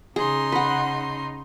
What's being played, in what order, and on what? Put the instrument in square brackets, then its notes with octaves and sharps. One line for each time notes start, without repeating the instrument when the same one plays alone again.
[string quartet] C#3 D#4 C6 [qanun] G#4
[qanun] B4 F#5